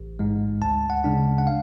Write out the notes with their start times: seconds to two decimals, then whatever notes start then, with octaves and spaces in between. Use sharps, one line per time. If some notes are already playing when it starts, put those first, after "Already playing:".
Already playing: A1
0.19 G#2 G#3
0.62 D2 A5
0.90 F#5
1.04 C#3 G#3 D4
1.38 F#5
1.47 F5